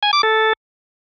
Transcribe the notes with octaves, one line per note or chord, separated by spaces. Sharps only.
G#5
D6
A4